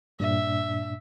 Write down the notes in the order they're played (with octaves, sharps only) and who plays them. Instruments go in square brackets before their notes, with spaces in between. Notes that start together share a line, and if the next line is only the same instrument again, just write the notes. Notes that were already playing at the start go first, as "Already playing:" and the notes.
[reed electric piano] G2 A#2 D4 [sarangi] E5